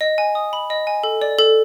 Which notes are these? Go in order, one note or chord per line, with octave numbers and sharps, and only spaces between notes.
D#5
G#5
D#6
B5
D#5
G#5
A4
D5
A4